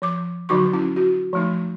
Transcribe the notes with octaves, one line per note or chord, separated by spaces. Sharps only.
F3 D6
D3 F#3 D#4 F#4 C#6
C#4 E4
F#4
F3 A3 D#4